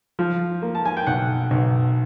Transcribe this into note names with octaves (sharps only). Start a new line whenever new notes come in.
F3
A#3
A5
G#5
G5
B1 F#5
B1